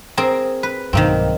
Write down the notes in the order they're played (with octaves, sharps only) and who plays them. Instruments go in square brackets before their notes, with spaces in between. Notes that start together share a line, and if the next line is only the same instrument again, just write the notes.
[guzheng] C4 G#4 A#4
B4
[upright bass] B1 G2 [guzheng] D#3 A#3 C4